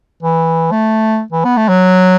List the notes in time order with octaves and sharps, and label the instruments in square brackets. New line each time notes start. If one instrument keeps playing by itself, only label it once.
[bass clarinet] E3
A3
E3
B3
A3
F#3